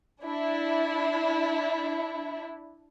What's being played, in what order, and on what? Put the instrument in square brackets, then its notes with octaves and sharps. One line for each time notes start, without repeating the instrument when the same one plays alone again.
[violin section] D4 E4